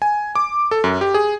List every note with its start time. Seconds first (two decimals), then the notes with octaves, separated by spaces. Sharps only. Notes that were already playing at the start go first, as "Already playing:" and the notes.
0.02 G#5
0.35 D6
0.71 A4
0.84 F#2
1.01 G4
1.14 G#4